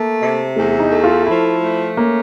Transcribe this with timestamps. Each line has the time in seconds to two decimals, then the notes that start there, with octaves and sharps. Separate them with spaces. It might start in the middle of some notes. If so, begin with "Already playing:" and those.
Already playing: A3 A#3
0.22 C3
0.56 E2 A3
0.80 D#4
0.91 A3
1.04 F4
1.26 F3 E4
1.62 A3
1.97 A#3 C#4